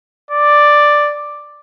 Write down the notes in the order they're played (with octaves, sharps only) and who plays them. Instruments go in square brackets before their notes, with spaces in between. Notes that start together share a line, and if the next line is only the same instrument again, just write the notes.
[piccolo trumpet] D5